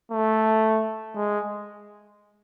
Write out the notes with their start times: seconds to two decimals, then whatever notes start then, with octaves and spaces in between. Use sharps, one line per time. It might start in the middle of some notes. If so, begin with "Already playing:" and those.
0.12 A3
1.16 G#3